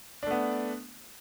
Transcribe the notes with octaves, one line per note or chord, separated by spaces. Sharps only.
A3 B3 D4